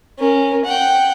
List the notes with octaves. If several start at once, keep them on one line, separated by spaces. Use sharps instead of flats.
C#4 A#4
F#5 G5